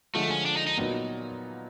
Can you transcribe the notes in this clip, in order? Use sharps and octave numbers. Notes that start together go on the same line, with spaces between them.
D3 F3 G#3 A3
C#4
D4
D#4
D#4
A#2 F#3 B3 D#4